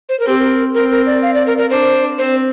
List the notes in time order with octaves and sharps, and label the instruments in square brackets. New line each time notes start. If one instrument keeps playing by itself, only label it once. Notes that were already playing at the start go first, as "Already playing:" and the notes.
[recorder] C5
A#4
[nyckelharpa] C4 [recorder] G4
[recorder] A#4
[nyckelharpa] C4 [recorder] A#4
[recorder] A#4
D5
F5
D5
A#4
A#4
[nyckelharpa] D4 [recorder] C5
[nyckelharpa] C4 [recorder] C5